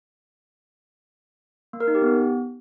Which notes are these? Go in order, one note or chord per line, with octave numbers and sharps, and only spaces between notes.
A#3
A#4
D#4
G4
B3